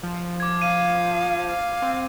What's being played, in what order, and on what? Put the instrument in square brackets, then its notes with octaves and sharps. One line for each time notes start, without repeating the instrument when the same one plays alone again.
[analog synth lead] F3
[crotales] D6 G#6
[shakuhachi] F5 [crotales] D#7
[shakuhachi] F5
[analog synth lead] C4